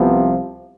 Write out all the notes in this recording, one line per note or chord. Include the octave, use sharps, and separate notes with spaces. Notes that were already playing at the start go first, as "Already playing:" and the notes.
Already playing: C2 C3 F3 B3